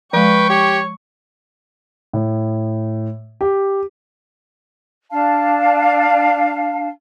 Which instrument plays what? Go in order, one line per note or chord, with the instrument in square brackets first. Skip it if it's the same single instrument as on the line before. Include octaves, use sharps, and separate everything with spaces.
[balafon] F3 G#3 [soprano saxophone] B4 [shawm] G5 [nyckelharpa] C#6
[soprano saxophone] G4 [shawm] C#5
[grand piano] A2
G4
[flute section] D4 F5 A5